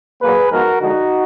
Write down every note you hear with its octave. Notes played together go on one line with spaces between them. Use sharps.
A#2 F#3 A#3 G#4 B4
G#2 F3 B3 F#4 A#4
D3 F3 G#3 D#4 F#4